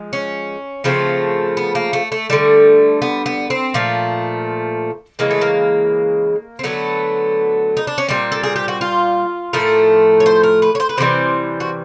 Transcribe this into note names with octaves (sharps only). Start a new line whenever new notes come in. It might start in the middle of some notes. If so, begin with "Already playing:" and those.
Already playing: F3 G#3
C#4
C#3 F3 A3 C4
B3
A#3
A3
A3
D3 G3 A3
B3
B3
C4
A#2 F3 A3
C#3 E3 G#3 A#3
A3
A#3
C4
D3 F#3 A3 B3
D#4
D4
C#4
A#2 G3 C4
A4
G#4
G4
F#4
F4
A2 F3 A3 A#4
C#5
C5
A#4
B4
C#5
C5
B4
C3 E3 G3 C5
F#4